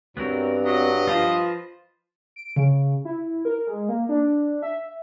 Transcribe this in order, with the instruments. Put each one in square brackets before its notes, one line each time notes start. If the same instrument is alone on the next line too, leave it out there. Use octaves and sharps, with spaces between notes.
[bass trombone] G2 [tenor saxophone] F#3 [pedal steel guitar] B3 C4 A#4
[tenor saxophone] F#3 [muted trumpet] D#5
[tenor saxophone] F3 [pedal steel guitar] F4 B4 C5
[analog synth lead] D7
C#3
E4
A#4
G#3
A#3
D4
E5